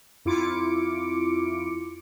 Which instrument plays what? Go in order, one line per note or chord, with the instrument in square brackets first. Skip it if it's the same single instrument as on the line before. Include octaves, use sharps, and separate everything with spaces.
[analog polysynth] F2 E4 F4 D6 C#7 D7